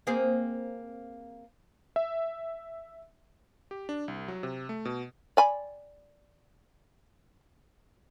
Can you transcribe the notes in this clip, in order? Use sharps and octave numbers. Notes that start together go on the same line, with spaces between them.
A#3 C4 G#4
E5
G4
D4
C2
F#3
C3
A3
B2
D5 G#5 B5